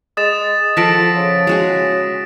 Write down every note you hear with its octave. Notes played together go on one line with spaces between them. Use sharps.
G#3 D#6 A6 E7
F3 A4 F#5 C6 A#6 B6 D7
C#3
G#3 F#4 G#4